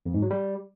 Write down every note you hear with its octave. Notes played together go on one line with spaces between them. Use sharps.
F2
G#2
F#3
G3